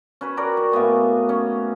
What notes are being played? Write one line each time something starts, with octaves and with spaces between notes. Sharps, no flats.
C#4 F#4 B4
F#4 A#4 D5 G5
C#6
A2 A#3 B3 G#5
C#4